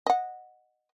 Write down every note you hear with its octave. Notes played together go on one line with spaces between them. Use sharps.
D#5 F#5